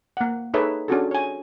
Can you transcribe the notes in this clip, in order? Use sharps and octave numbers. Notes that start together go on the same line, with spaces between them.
A#3 F#5
D#4 G#4 A4 B4 C#5 E5
C#4 D4 F4 F#4 G#4 A4
C#5 G#5